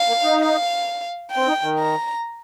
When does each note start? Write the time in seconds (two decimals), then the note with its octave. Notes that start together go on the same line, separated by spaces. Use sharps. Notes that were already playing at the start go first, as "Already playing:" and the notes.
Already playing: F5
0.08 A#3
0.24 D#4
0.39 F5
1.32 G5
1.37 C4
1.48 D#4
1.63 D#3
1.79 A#5